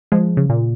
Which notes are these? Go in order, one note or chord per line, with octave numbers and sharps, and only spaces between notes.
F3 G#3
C#3
A#2